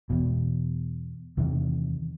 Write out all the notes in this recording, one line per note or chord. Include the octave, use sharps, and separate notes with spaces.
E2 B2
E2 C3 D#3 E3